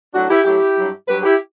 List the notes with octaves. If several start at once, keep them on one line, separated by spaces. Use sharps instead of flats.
A2 F#3 D4 F#4
E4 G4
A2 F#3 E4 G4
G2 F#3
G2 F#3 G4 B4
E4 G4